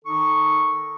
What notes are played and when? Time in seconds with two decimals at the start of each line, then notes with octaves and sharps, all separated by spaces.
0.05 D#3 D#4 A4 C#6